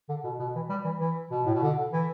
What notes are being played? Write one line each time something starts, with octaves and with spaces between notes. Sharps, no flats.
D3
B2
B2
E3
G3
E3
E3
B2
A2
B2
D3
E3